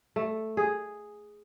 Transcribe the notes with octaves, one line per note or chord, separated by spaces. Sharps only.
A3
G#4